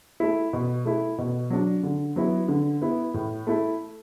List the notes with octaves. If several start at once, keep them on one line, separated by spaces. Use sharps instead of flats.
A3 E4
B2
A3 E4
B2
F#3 D4
D3
F#3 B3 E4
D3
B3 E4
A2
A3 E4